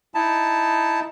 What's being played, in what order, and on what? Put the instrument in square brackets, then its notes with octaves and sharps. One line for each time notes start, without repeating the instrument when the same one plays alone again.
[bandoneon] D#4 E4 A5